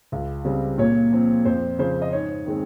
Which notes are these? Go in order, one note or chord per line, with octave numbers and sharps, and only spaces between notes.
C#2
C#3 G3 C4
A#2 C#5
F3 C4
F2 C5
C#3 F3 C5
D#5
G#2 C#5
D#3 G#3 C4